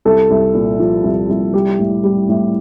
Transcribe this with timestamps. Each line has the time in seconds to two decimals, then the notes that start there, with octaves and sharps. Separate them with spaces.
0.05 C2 A4
0.30 C2
0.54 A#2
0.80 F3
1.03 C2
1.29 C2
1.53 G3 G4
1.79 A2
2.04 G3
2.29 A2